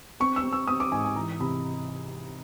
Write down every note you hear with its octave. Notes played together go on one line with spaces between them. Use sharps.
C4 C#6
E6
C4
E6
C4 D#6
D6
G#2 G#5
G#5
E3 A#5
C3 B5